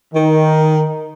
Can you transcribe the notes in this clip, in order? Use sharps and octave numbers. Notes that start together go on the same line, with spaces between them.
D#3